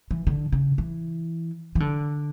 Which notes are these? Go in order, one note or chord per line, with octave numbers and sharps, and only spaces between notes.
E3
D3
C#3
E3
E3
D3